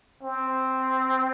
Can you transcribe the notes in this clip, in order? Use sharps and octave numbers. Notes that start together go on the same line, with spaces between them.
C4